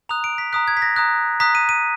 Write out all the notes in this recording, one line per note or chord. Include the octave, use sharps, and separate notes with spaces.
A#5 D#6 F#6 F7
D7
B6
A#5 D#6 F#6 B6
G#6
B6
A#6
A#5 D#6 F#6
A#5 D#6 F#6 B6
D#7
D#7